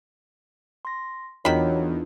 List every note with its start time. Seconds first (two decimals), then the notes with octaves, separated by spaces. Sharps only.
0.85 C6 A#6
1.45 E2 D#3 F#3 D4 D#4 F4 B5